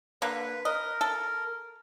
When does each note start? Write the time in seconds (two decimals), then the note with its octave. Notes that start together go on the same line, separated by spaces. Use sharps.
0.22 D3 A#3 B4
0.65 A#4 D#5
1.01 A4